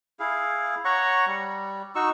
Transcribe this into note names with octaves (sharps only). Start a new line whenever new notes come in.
E4 G#4 F5
C#5 F#5 A#5 C#6
G3
D#4 F#4 C#6 E6